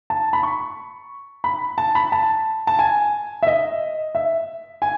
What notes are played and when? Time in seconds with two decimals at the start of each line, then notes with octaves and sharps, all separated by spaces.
0.10 A5
0.33 B5
0.43 C#6
1.44 B5
1.78 A5
1.95 B5
2.12 A5
2.67 A5
2.79 G#5
3.42 E5
3.47 D#5
4.15 E5
4.82 G#5